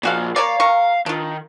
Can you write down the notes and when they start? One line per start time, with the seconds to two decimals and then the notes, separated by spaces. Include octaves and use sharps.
0.03 A#2 F3 G#3 F#4 F5
0.36 A#3 C#5 D5 F5
0.60 C3 A#4 C#6
1.06 D#3 D4 F4